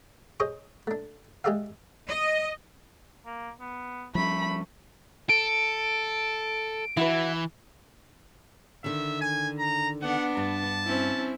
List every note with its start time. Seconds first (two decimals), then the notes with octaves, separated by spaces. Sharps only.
0.40 G#4 C5 C#5 D#5 C#6
0.87 A3 D4
1.44 G#3 G4 G#4 D5 E5 F5
2.08 D#5
3.26 A#3
3.61 B3
4.15 F3 G3 A3 C#4 B5
5.29 A4 D7
6.97 E3 E4 F#4 B4
8.84 D3 D#3 E5
9.21 G#5
9.59 A#5
10.02 B3 D4 F#5
10.37 G2 A5
10.84 C4 C#4 E4